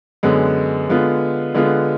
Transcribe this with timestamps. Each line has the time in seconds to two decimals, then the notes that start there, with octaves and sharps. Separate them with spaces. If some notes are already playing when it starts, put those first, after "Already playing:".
0.23 F#2 D3 G#3 B3
0.89 D3 G#3 B3 F4
1.54 D3 G#3 B3 F4